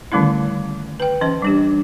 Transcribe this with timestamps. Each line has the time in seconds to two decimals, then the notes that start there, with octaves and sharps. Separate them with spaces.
0.12 D3 D#3 G3 A3 C#4 E4
1.00 B4 G5
1.21 E3 C#4 D#5
1.42 G3 D4 G4